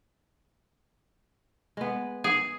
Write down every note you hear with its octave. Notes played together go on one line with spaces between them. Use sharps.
G#3 B3
G#4